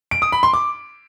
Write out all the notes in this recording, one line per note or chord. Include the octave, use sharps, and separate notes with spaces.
D7
D#6
B5
C6
D6